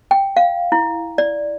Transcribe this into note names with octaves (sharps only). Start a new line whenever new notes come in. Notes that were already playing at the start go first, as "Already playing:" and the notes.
G5
F5
E4
D5